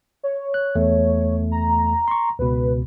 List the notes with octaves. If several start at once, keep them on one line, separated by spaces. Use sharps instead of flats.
C#5
F#6
E2 A3
A#5
C6 C#6
C#2 B2 B4